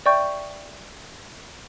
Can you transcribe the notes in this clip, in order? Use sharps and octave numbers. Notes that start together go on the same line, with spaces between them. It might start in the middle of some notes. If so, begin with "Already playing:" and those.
D5 E5 G5 C#6 G6